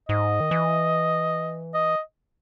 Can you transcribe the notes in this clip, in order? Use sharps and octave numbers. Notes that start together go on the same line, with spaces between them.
G#2 D#5
D#3
E3
D#5